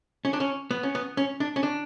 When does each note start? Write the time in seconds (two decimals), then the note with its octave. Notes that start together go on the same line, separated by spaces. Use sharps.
0.25 C#4
0.33 D4
0.40 C#4
0.71 B3
0.83 C#4
0.95 B3
1.17 C#4
1.40 D4
1.56 C#4
1.63 D4